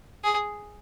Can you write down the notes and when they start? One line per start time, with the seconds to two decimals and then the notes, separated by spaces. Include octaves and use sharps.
0.24 G#4